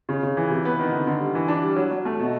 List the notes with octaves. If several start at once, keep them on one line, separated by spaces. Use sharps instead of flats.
C#3
C#3
E3
C3
B3
D#3
D3
D3
G3
E3
D4
G3
F#3
F#3
A3
B2